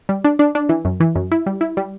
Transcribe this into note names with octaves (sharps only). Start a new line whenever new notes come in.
G3
D4
D4
D4
E3
F#2
E3
F#2
E4
G3
E4
G3